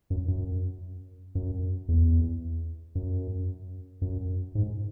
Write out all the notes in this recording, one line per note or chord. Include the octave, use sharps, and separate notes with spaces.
F#2
F#2
F#2
E2
F#2
F#2
G#2